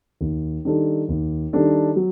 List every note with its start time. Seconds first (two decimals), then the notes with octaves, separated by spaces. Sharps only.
0.21 D#2
0.65 D#3 G3 D4 A4
1.09 D#2
1.53 D#3 G3 D4 A4
1.96 F#3